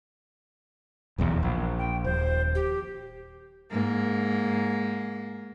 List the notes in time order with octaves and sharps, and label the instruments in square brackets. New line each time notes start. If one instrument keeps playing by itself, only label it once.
[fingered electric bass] D#1 B1 E2
A#1
[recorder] G5
[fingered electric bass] D#1 [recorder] C5
[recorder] G4
[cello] G#2 A#3